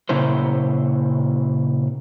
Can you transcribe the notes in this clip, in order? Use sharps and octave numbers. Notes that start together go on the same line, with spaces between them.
A#2 C#3 C#4 E4 C5